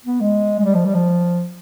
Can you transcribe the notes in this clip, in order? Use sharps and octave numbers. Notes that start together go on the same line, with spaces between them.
B3
G#3
G#3
G3
F3
G3
F3